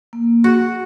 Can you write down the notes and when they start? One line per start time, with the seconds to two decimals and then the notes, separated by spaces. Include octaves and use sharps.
0.13 A#3
0.44 F#4 G#4